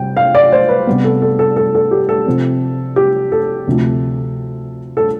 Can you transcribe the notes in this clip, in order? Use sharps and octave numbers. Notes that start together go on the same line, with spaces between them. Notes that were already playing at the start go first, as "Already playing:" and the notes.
Already playing: C3 G3 C4 G5
F5
D5
C5
B4
C3 G3 B3
A4
A4
A4
A4
A4
G4
A4
C3 F3 C4
G4
A4
D2 C3 F3
A4